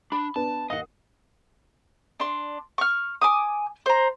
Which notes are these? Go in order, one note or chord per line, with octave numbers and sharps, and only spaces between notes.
D4 B5
B3 D4 B4 A5
D#2 D#5 F5 F#5 D#6
D4 C6
C#6 F6
G#5 D6 D#6
C5 A#5